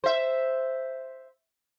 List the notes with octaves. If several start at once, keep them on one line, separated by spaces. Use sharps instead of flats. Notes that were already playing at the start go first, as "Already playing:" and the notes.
C5 E5